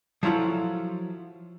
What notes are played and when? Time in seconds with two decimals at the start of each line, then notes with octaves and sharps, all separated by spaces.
0.23 F3 F#3 E4 F4 A4